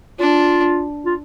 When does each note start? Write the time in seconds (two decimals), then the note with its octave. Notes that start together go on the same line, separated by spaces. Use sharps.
0.19 D4 F4
1.05 F4